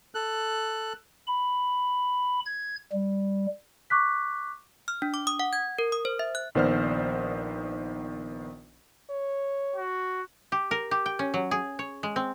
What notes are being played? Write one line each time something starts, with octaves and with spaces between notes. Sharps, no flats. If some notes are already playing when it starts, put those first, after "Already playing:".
A4 F#6
B5
G#6
G3
C#6 D6 F#6 B6
F6
D4
D6
D#6
F#5
G#6
A#4
D#6
C5
E5
F#6
A#1 D#3 B3 C5 D5 F6
C#5
F#4
G4
A#4
G4
G5
C#4
F#3
G#4
C#5
G#3
C4